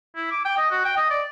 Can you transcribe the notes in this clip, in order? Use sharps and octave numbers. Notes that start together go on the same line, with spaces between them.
E4
D6
G5
D#5
F#4
G5
D#5
D5